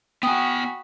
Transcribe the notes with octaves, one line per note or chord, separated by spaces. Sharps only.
B3 F#4 G5 G#5 B5 D#6 B6